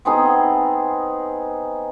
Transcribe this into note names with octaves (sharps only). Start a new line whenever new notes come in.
B3 C4 D#4 G#4